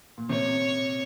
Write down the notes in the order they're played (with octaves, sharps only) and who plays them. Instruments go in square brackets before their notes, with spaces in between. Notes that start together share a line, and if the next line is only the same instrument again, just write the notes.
[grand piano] A#2
[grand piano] C3 [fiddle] C#5